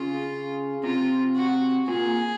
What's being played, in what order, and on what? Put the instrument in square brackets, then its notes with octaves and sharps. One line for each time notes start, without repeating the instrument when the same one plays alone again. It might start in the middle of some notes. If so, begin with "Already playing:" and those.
Already playing: [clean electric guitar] C#3 [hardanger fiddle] F4
[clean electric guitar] C3 [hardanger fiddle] F4
[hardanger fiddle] F#4
[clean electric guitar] A#2 [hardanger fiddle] G#4